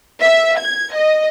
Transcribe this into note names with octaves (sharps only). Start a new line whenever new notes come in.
E5
G#6
D#5